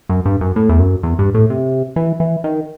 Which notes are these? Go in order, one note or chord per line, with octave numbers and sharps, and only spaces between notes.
F#2
G2
F#2
A2
E2
F#2
E2
G2
A2
C3
E3
E3
D#3